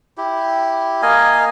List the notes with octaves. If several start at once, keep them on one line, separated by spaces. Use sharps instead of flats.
E4 G4
A#3 D#5 F5 G#5